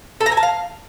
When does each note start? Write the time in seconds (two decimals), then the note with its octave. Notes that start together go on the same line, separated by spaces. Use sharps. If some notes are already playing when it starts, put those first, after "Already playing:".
0.20 A4
0.26 A#5
0.32 G#5
0.37 A5
0.43 F5